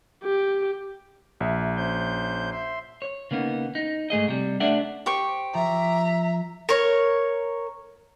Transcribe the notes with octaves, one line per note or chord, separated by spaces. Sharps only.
G4
A#1 E5
C#4 C5 G6
E5 C6
C#5
C#3 A#3 B3 D#4
D#4
G#2 A3 G#4 D#5
C3 G3
A3 D4 A4 D5 E5 F#5
G4 C5 C#6
F3 E5 A#5
A#4 C#5